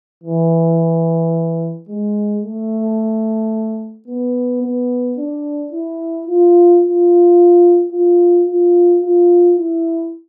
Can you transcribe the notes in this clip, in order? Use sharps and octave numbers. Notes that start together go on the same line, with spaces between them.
E3
G#3
A3
B3
B3
D4
E4
F4
F4
F4
F4
F4
E4